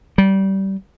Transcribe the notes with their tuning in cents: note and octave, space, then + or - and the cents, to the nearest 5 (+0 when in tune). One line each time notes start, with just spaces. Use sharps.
G3 -20